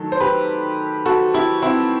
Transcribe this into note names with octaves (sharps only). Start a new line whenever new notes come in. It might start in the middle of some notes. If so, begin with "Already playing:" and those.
Already playing: D#3 F#3 A3 A4
C5
G4 B4
F#4 A4
E4 G4
C4 E4